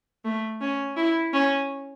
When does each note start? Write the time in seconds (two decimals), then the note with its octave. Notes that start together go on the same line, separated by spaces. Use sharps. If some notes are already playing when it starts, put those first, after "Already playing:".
0.25 A3
0.61 C#4
0.96 E4
1.33 C#4